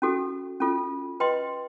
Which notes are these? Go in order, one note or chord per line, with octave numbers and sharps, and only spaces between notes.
C#4 F#4 A4
C#4 F4 A4
B4 D#5 G5 C6